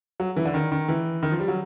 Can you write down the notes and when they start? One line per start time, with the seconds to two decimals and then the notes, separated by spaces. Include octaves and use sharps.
0.20 F#3
0.36 E3
0.45 D3
0.54 D#3
0.72 D#3
0.88 E3
1.23 D#3
1.31 F3
1.40 G3
1.48 F#3